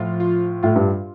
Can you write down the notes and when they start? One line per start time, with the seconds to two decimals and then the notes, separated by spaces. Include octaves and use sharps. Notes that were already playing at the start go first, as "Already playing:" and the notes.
Already playing: A2 F3 F4
0.20 F4
0.63 A2 F4
0.76 G2